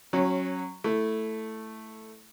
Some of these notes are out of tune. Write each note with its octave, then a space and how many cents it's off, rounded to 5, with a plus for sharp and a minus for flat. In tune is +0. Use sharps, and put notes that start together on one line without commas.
F#3 +0 C#4 -20
A3 +0 E4 +0